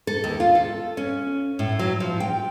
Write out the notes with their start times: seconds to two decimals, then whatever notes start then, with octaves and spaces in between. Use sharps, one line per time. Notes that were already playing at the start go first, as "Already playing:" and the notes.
0.07 A4
0.24 D#2
0.40 F4
0.55 A4
0.97 C#4
1.59 A2
1.79 F#3
2.00 F3
2.20 G5